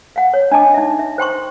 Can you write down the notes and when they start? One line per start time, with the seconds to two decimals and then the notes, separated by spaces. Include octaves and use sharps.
0.16 F5 F#5
0.34 C#5
0.51 D4 D#5 A5 D6
0.74 D#4 E5
0.99 E5
1.18 C5 G5 C6 C#6